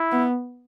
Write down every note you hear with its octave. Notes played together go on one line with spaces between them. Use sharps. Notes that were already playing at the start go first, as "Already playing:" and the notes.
Already playing: E4
B3